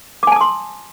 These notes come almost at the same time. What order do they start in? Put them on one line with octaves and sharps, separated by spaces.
D6 G#5 A5 D#6 C6